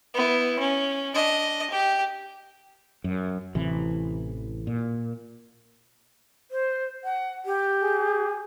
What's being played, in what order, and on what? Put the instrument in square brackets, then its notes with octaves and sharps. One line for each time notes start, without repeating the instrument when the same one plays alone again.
[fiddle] B3 E4
C#4
D4 D#5
G4
[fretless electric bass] F#2
A1 C3 E3
A#2
[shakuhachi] C5
F#5
G4
[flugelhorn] G#4